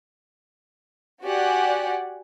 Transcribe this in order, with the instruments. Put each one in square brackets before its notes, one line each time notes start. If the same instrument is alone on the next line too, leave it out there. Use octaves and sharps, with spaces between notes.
[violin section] F#4 G4 D5 F#5 G#5